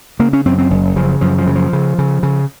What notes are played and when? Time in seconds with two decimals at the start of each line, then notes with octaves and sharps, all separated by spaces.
0.19 C#3 A#3
0.33 C#4
0.46 F#2 C4
0.58 C4
0.70 F#1
0.96 C#3 F3
1.21 F#2 F3
1.38 F3
1.47 C#3
1.56 F3
1.73 C#3
1.98 C#3
2.23 C#3